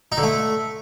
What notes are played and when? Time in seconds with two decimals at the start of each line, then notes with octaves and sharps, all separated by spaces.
0.12 D#4
0.17 D3
0.23 A3